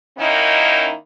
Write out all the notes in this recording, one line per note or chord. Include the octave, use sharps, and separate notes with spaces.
D#3 A#3 C#4 D#4 E4